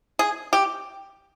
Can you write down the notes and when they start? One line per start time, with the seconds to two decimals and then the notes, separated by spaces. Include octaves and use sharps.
0.19 G#4
0.53 G4